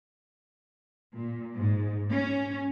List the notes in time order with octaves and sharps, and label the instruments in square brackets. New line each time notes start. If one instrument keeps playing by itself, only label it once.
[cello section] A#2
G#2
C#4